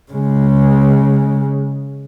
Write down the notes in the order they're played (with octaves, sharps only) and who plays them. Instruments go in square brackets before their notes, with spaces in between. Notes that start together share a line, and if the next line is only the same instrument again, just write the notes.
[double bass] C#3 G#3